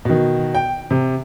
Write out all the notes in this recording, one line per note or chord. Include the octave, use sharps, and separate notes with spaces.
B2 D#3
G5
C3